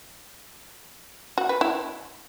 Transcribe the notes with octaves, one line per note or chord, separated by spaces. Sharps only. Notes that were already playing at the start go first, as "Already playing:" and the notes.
F#4
B4
E4